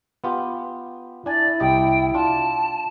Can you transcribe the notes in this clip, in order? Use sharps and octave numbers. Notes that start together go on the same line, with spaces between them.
B3 F4 G4
D4 E4 D5 G#5
C2 G4 D#5 G5
D4 F4 A5